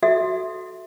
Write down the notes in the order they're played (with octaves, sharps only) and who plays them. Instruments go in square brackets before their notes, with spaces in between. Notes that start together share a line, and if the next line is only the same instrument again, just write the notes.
[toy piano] F#4 A4 E5